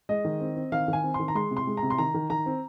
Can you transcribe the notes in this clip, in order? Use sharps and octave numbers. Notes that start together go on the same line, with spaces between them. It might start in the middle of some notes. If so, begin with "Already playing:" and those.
G#3 D#5
D#3
C4
C4
D#3 F5
D#3
G#5
C4
C6
D#3
A#5
G#3 C6
C3
C6
G#3
A#5
C3
C6
D#3 A#5
D#3
D#3 A#5
C4